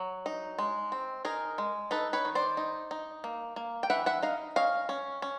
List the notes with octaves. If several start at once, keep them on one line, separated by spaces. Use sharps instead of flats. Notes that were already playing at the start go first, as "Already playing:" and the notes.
Already playing: F#3
D#4
G#3
C4
D#4 G#4 A#4
G#3
D#4 A4 B4
B4 C#5
D#3
C5 D5
D#4
D#4
A#3
A#3
G5
E3 E5 F#5
E5 F#5
D#4 D#5 F5
C#4 D#5 F5
C#4
C#4